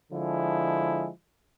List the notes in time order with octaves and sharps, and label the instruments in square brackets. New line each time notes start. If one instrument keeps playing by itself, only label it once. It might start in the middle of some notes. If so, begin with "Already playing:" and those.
[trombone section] D3 F3 G#3 E4